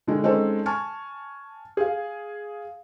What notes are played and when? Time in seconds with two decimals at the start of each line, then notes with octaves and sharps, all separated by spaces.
0.07 D3 D#3 G#3
0.24 G#3 C4 C#4 D#4 A4
0.66 G#5 A5 C#6 F6
1.77 G#4 F5